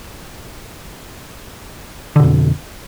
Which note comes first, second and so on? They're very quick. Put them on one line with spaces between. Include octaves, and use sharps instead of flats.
D3 B2 F2